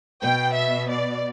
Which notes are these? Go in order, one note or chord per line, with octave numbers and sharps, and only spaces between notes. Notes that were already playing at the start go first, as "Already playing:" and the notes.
B2 G5
E5
D5